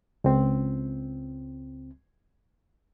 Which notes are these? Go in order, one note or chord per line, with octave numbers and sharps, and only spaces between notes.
C#2 C4